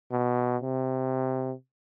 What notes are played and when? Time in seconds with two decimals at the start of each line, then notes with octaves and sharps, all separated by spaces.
0.11 B2
0.62 C3